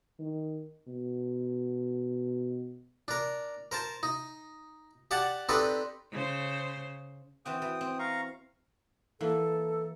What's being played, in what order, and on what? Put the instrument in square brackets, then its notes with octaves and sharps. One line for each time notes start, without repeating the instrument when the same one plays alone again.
[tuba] D#3
B2
[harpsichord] D4 A#4
A#4 C5 A5
D#4
G4 D5 F#5 A5
C4 D4 D#4 G4 A4 B4
[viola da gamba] C#3 C5
[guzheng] E3 C4 F#4 [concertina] G5 D#6
[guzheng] E3
C4
[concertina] F5 A#5 C#6
[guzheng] E3 A#3 [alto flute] A4